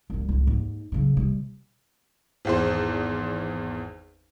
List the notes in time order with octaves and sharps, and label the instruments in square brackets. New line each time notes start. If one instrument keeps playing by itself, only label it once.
[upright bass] C2 G3
C#2
D#2 G#2
C#3 F#3
C3 G3
[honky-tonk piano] G#1 E2 C5